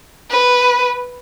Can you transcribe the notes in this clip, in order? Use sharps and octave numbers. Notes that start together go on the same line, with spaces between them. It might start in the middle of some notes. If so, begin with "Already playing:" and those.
B4